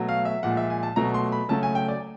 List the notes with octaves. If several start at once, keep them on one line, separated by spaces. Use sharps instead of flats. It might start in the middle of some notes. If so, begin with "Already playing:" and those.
Already playing: B2 F#3 A3
F5
E5
A#2 F3 G#3 F#5
E5
G#5
A5
B2 F#3 A3 A#5
C6
B5
C#3 F#3 A3 A5
G#5
G5
D5